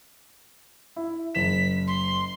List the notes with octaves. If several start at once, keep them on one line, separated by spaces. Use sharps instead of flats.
E4
F#1 B6 E7
C6